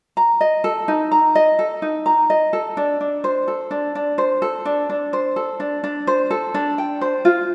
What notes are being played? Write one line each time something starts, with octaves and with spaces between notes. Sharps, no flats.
A#5
D#5
A4
D#4
A#5
D#5
A4
D#4
A#5
D#5
A4
D4
D4
C5
A4
D4
D4
C5
A4
D4
D4
C5
A4
D4
D4
C5
A4
D4
G5
C5
F4